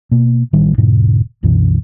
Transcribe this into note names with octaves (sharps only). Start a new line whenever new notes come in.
B2 A#3
A1 D#3 G3
E1 G#2 B2 D3
C2 F#2 B2 E3